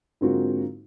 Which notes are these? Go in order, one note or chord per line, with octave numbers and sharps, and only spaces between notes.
G#2 D3 A#3 C4 F4 F#4